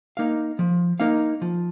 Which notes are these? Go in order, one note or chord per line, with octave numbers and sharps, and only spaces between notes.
A#3 D#4 A#4 F5
F3
A#3 D#4 A#4 F5
F3